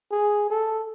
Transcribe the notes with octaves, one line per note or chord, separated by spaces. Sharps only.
G#4
A4